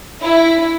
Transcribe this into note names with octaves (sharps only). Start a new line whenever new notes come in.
E4